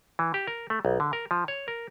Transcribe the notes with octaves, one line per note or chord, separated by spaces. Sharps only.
E3
G4
A#4
A3
B1
D3
A#4
F3
C#5
A#4